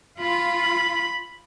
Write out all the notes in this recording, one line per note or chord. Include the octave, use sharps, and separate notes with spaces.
F4 B5